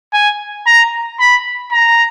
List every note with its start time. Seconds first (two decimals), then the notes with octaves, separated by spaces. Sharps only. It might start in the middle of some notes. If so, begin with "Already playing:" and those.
0.13 G#5
0.66 A#5
1.19 B5
1.72 A#5